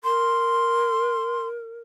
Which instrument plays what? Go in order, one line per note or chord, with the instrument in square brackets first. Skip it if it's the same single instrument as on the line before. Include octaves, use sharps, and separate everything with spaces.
[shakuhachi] A#4 [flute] C6